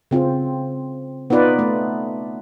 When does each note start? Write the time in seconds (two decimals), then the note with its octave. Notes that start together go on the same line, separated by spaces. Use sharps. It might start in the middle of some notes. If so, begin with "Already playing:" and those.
0.11 C#3 C4 F4
1.30 B3 D#4 F4 B4 D5
1.59 A3